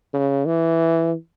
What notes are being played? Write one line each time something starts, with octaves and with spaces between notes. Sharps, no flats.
C#3
E3